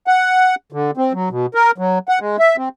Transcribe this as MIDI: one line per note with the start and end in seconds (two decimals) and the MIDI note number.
0.07 0.55 78
0.72 0.91 50
0.97 1.13 60
1.13 1.29 54
1.30 1.46 47
1.54 1.71 70
1.78 1.99 54
2.08 2.19 78
2.20 2.37 56
2.39 2.56 76
2.58 2.69 60